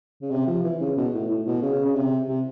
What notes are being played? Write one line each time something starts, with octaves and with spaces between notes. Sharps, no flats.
C#3
C3
F3
E3
C#3
B2
A2
A2
B2
C#3
C#3
C3
C3